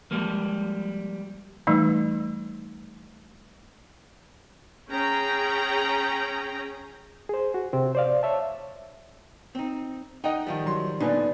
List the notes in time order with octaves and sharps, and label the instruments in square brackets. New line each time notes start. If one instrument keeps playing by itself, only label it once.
[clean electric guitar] F3 G3 G#3 A#3
[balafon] E3 G3 A3 D#4
[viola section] C#4 G#4 G5 A#5
[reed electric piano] G#4 C5
F#4
C3 C4
C5 D5 F5
C#5 E5 A5
[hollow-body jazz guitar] C4 D#4
[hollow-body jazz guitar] D#4 [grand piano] D#5 F#5 G5
[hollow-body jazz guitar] D#3 F3 G3
[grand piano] F#3 C6
[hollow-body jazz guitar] A#2 D3 B3 [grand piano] D#4 B4 G#5 [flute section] D5